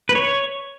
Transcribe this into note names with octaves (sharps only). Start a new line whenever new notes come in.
B4
C#5